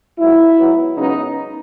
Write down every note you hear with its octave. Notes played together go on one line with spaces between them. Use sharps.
G#2 F#3 A#3 E4
G#2 F#3 B3
F#2 C#3 G#3 B3 D#4